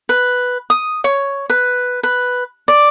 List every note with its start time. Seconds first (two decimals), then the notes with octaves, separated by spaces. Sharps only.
0.09 B4
0.70 D#6
1.04 C#5
1.50 B4
2.03 B4
2.68 D5